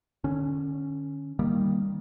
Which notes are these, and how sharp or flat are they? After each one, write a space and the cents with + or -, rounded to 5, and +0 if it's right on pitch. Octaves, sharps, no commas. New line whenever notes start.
D3 +30 C#4 +0
D#3 +0 G3 +0 A#3 +0